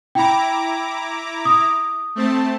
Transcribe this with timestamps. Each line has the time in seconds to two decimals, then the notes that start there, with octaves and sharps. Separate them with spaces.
0.15 E4 G5 A#5 B5 D6
1.45 D#6
2.16 A3 C4 A5